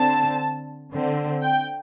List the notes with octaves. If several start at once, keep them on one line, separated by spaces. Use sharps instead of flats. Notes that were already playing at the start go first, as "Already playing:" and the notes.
Already playing: D3 C4 A5
D3 C4
G5